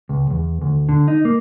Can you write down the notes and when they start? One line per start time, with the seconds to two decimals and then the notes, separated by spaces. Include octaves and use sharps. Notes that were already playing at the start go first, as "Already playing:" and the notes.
0.09 C#2
0.30 E2
0.62 D2
0.89 D3
1.08 D#4
1.25 A#3